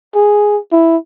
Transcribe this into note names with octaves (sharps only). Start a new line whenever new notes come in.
G#4
E4